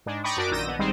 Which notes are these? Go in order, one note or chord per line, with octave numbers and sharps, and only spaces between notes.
G#2 G#3 D4
D5 G5 A#5 B5 C#6 D#6
F#2 D4 F#4 A#4 D5 D6
A#1 D#3 E6 G6 A#6 D#7
A#1 B3
G#1 G3 G#3 C4 D#4 C5